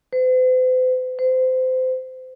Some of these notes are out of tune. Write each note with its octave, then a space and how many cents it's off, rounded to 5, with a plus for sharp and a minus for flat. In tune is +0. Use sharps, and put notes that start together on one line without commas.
C5 -45
C5 -25